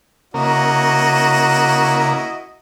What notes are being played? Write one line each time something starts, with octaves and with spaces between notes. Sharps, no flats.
C#3 A#3 E4 F#4 A#4 D#5